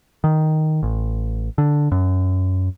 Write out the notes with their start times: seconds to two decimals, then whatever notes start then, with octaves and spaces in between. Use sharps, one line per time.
0.24 D#3
0.83 A1
1.58 D3
1.92 F#2